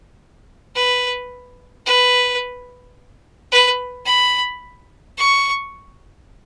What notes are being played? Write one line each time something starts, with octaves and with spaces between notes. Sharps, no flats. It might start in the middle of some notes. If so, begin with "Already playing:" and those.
B4
B4
B4
B5
C#6